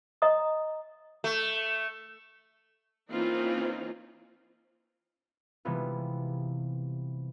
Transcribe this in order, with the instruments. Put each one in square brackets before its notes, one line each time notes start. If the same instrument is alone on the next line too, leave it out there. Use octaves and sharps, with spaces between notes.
[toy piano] D#5 A#5 D#6
[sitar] A3
[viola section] E3 A#3 C4 C#4 D#4 F4
[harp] C3 E3 G3 G#3 B3 F4